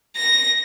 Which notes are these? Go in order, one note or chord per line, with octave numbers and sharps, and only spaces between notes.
A#6